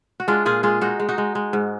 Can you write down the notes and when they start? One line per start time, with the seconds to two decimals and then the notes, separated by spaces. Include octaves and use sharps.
0.20 F#4
0.28 G#3 D4 F4
0.46 A#2 F4 G#4
0.63 G#3 F4 G#4
0.81 G#3 D#4 F#4
1.00 G#3
1.09 D#4 F#4
1.18 G#3
1.35 G#3
1.53 G#2